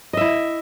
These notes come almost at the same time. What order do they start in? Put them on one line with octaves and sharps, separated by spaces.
D#5 E5 E4